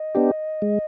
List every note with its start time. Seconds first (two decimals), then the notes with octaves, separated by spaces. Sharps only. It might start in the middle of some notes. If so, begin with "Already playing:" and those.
Already playing: D#5
0.15 B3 D4 G4
0.62 G#3